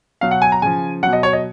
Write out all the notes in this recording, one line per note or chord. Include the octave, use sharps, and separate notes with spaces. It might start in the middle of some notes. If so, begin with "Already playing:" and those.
B2 F#3 F5
F#5
G#5
A#5
C#3 F3 G#5
B2 F#3 F#5
D#5
C#5
D#5